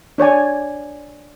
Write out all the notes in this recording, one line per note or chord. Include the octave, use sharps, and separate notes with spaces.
D4 C#5 D5 G#5